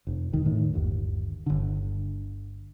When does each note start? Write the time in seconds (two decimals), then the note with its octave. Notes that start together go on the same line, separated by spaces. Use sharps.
0.07 F1
0.32 E1 D#3
0.45 A2 D#3
0.74 G1 D#2
1.46 G1 D3